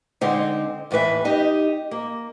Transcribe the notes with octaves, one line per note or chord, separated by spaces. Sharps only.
D3 G#3 C4 D#4
D#2 A2 E3 B4 E5
D#4 G4 D#5
A#3